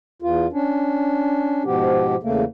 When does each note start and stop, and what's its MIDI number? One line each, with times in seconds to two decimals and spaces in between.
0.22 0.47 40
0.22 0.47 65
0.53 1.63 61
0.53 1.63 62
1.65 2.16 44
1.65 2.16 47
1.65 2.16 53
1.65 2.16 59
1.65 2.16 67
2.23 2.44 40
2.23 2.44 49
2.23 2.44 57
2.23 2.44 58